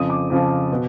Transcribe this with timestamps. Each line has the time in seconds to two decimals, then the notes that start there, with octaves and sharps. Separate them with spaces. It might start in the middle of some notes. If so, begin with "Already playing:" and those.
Already playing: F2 C#3 F3 D#6
0.10 D6
0.30 F2 C#3 F3
0.72 B2